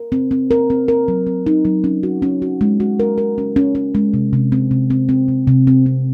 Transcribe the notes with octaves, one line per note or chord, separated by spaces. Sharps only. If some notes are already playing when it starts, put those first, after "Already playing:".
Already playing: A#4
C4
C4
A#4
C4
A#4
F#3
C4
D#4
F#3
C#4
F#4
C#4
F#4
G#3
F#4
A#4
A#4
C#4
C#4
C#4
G#3
C3
C3
C4
C3
C4
C4
C3
C3
C4
C4